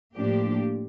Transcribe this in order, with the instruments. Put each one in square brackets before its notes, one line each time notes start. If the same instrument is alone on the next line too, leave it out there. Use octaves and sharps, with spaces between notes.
[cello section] A2 F3 A#3 D4 G4